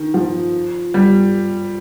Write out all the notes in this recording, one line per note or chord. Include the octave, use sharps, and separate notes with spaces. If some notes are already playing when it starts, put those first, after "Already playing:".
Already playing: D#3
F3
G3